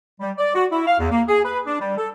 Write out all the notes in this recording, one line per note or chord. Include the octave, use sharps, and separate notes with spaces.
G3
D5
F#4
E4
F5
E2
A#3
G#4
B4
D4
G3
A4